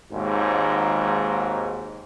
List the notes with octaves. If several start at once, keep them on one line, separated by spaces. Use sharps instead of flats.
G#1 D#2 G#2